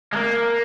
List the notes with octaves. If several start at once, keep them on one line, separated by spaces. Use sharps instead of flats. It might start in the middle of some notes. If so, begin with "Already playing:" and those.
G#3
A#3